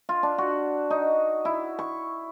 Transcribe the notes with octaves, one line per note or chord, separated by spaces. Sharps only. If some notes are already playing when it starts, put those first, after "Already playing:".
F4
D4
F#4
D#4
E4
C#6